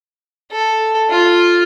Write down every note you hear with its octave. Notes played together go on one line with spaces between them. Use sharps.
A4
F4